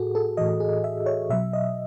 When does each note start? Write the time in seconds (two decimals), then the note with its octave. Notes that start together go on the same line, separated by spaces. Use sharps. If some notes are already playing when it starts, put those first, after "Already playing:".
Already playing: A2 F#4 G#4 A4
0.15 A4
0.37 A2 E3 D#5
0.60 G#4
0.84 E5
1.06 C#5
1.29 B2 F#3 E5
1.53 D#5